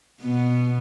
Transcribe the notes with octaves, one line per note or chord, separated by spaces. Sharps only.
B2 B3